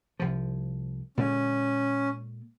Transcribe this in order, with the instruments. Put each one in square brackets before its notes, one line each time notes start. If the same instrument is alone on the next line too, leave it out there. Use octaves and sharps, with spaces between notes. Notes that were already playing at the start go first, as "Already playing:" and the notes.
[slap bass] C2 F3
[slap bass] A#2 D3 G#3 [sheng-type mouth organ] C#4